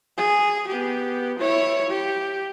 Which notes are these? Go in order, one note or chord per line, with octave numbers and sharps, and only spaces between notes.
G#4
B3 G4
E4 C#5
G4